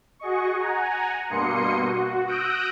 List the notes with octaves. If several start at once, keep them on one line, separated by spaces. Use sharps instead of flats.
F#4 G#4 D#5 C#6
F#5 G#5 A#5
G2 B2 A#3 C6 D#6 C#7
F#4
D#6 E6 F#6 G6 A#6 D7